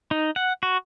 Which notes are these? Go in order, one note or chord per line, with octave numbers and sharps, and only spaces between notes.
D#4
F#5
F#4